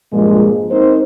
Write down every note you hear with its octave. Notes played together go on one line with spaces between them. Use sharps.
G2 A#2 F3 G#3
C4 D#4 A#4 C5